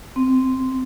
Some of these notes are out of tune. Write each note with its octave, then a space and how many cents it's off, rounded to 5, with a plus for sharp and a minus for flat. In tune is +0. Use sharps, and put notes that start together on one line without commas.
C4 -5